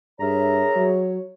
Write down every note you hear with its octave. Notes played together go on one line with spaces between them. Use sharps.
G2 G#4 A#4 C#5 E5 A#5
F#3